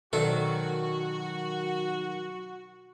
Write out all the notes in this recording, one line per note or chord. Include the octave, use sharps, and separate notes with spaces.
B2 D#3 F#3 F#4 A4 A#4 D5